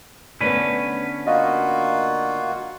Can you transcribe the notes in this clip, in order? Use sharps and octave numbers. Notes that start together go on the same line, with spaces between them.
D3 A3 B3 C#4 B4
A#3 F4 F#4 D#5 F5 F#5